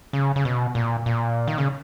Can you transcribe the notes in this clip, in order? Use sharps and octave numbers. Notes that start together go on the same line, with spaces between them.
C#3
C#3
B2
A#2
A#2
D#3
C#3